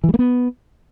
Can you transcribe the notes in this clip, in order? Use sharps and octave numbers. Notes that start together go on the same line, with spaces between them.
E3
G3
A#3
B3